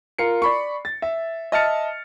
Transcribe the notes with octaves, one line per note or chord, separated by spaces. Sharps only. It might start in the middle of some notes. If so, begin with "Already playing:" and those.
F4 A#4 C7 C#7
D5 B5 C#6
A6
E5
D#5 E5 A5 F6 A6 C#7